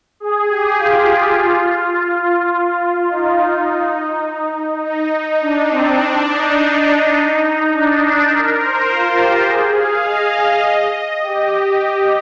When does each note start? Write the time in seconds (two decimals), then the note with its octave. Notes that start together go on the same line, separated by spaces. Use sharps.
0.20 G#4
0.49 G4
0.78 F4
3.10 D#4
3.39 D#4
4.84 D#4
5.12 D#4
5.42 D4
5.71 C4
5.99 D4
6.30 D#4
7.74 D4
8.03 D4
8.31 A#4
8.60 C5
8.89 F4
9.19 G4
9.48 G#4
9.77 F5
10.05 D#5
11.22 G4